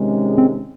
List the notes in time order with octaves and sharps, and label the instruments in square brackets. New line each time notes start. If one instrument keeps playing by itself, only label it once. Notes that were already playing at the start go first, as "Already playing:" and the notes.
Already playing: [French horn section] C3 D#3 G#3 C#4
[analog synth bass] C4